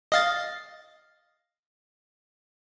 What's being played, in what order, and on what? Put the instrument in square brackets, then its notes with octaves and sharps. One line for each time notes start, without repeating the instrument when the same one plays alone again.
[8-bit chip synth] D#5 F5 A6